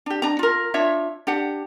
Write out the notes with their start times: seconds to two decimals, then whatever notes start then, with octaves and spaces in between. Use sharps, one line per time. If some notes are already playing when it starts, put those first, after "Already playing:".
0.06 D4 G4
0.22 D4 A#5
0.39 F4 A#4
0.74 D4 F4 C#5 E5
1.27 D4 G4 F#5